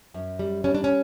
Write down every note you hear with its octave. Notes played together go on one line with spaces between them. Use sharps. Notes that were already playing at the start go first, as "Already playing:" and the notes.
F#2
G3
G3 C#4
D4
C#4